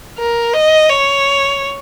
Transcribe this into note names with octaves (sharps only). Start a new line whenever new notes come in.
A#4
D#5
C#5